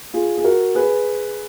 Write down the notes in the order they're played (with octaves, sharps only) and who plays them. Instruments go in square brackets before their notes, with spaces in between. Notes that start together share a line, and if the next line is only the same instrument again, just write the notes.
[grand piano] F4 G#4
G#4
F#4 A#4
G#4 B4